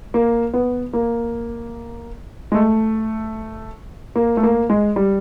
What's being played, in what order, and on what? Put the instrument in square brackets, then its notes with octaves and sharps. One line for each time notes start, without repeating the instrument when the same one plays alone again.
[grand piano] A#3
B3
A#3
G#3
A3
A#3
A3
A#3
G#3
G3